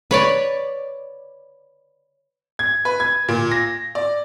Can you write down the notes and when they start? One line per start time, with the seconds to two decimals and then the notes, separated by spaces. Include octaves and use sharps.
0.11 B4 C#5 D5
2.59 G#6
2.85 B4
3.00 G#6
3.29 A#2
3.51 A#6
3.95 D5